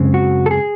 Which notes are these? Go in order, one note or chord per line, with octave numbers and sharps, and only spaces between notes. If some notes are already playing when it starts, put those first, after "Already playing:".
Already playing: F#2 C#3 G#3 C4
F#4
A4
G#4